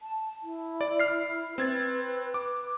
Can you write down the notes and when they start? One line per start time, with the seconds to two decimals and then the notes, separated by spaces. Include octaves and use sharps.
0.02 A5
0.43 E4
0.81 D5
1.00 F6 C7
1.58 C4 B4 G#6 A6
2.34 D6